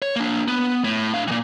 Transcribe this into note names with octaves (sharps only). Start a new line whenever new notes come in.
C#5
A#3 D4
B3
A2
D4 F5
A#2 E3